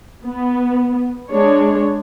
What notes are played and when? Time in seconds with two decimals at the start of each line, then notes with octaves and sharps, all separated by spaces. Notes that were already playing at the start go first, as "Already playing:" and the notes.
0.25 B3
1.29 G#3 D4 C#5